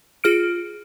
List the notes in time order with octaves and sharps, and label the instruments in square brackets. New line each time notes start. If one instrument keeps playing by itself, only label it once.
[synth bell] F4 G#4 F6 D7